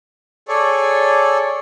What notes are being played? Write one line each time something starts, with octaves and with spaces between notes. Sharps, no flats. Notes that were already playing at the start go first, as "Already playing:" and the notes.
G#4 A4 C#5 D5